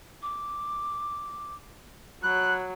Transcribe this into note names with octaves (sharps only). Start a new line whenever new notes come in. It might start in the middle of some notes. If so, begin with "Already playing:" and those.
D6
F#3 B5 F#6